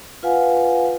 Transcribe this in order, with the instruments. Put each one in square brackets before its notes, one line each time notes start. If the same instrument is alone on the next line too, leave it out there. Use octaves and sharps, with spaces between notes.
[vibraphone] F4 B4 F5 F#5 G#5